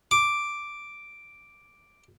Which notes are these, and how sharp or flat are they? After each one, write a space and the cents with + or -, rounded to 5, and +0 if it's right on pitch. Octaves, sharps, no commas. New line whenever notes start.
D6 +0